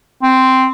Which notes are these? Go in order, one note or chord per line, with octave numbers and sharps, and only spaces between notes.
C4